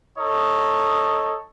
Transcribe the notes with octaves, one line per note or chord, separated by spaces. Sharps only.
D#4 A4 C#5 D#5